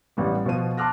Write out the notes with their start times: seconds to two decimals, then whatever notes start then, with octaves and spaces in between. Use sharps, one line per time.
0.17 A1 G3 B3
0.45 B2 F3 F#4 C5 D#7
0.77 A5 C6 D6 F6 F#6 A#6